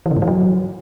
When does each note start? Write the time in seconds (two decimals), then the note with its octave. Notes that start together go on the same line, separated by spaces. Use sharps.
0.06 E3
0.11 C#3
0.17 G#2
0.22 E3
0.28 F#3